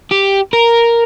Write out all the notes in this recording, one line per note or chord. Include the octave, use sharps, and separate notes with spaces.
G4
A#4